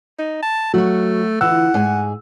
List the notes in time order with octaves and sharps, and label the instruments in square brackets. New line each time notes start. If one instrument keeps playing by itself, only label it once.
[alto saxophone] D#4
A5
[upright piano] F#3 [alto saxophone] A3 [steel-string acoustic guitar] F#4 F#5
[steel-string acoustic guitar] D3 E3 F4 [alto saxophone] F#5 [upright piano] E6
[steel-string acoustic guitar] G#2 G#4 G#5